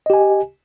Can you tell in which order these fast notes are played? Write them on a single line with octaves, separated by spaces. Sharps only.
D#5 G4 G#5